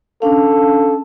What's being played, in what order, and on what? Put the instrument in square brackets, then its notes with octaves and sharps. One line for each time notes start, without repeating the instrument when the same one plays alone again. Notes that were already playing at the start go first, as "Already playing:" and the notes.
[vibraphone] C#4 D4 F5 [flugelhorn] A4